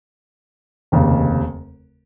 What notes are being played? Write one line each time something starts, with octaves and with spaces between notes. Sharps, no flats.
F1 D#2 C#3